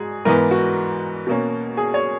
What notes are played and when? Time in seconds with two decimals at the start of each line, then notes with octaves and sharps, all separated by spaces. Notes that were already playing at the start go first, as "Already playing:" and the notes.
Already playing: G#2 F#4 G#4
0.25 G#2 E3 B3 A#4
0.51 F#4
1.27 B2 A#3 C#4
1.77 G#4
1.94 C#5